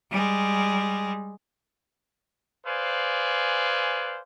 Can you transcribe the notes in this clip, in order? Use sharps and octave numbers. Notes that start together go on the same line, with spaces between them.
G3 G#3
G#4 B4 C5 D5 F5 G#5